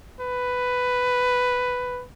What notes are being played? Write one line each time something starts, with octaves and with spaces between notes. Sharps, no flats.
B4